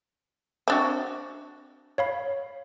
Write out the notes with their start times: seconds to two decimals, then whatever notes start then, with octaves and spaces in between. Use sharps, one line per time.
0.68 C4 D4 F#4
1.98 C#5 F5 B5